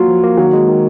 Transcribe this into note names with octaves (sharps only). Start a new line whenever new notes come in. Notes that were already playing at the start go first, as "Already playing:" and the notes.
Already playing: F#3 A#3 F4
F3
A#3
D#3 F#3
G#3
D#3